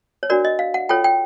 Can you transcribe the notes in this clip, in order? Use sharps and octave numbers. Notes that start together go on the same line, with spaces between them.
C#5
D4 F#4 A#4 D5
D#5
F5
F#5
F4 A4 C#5 G5
G5